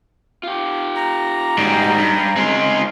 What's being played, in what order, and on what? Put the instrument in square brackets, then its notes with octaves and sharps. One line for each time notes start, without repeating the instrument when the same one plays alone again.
[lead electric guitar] F4 G4
[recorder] A#5
[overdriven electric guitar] G#2 G3 [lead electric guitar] F#3 D#4
[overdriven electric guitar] G2
[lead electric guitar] D#3 C4 [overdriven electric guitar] G#3 F4